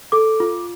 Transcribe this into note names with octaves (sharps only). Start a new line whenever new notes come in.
A4 D6
F4